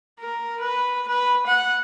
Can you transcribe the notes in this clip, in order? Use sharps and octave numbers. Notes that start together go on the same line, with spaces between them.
A#4
B4
B4
F#5